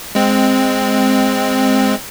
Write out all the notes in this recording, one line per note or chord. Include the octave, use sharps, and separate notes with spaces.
G#3 C4